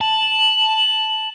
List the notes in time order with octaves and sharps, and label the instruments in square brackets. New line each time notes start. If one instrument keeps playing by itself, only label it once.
[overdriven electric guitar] A5 [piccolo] F#7